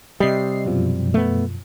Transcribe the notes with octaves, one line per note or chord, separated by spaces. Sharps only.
C3 G3 D#5 C7
F#2 B2 F3
A3 B3